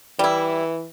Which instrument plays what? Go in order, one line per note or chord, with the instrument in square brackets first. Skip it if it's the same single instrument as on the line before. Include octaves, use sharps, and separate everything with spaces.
[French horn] E3 [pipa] G3 E4